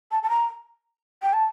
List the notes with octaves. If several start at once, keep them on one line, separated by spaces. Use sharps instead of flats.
A5
A5
A#5
G5
A5